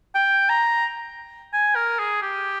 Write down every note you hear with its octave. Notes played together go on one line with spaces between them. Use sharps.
G5
A#5
G#5
A#4
G#4
G4